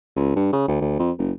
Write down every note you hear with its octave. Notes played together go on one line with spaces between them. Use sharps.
C#2
G2
C#3
D2
D2
F2
F#1